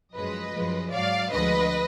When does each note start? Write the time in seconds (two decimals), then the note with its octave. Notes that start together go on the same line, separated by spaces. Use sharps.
0.14 F#2 F3 G#3 B4 D#5
0.54 F#2 F3 G#3
0.92 G#2 F#3 D5 F5
1.31 D2 D3 F3 G#3 B4 D#5